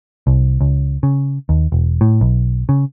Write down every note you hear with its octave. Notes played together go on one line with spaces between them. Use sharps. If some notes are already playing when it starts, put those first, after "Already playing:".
C2
C#2
C#3
D#2
E1
A2
B1
C#3